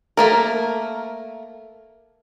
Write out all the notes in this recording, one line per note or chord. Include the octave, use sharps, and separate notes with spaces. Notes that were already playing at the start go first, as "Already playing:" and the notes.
A3 A#3 A#4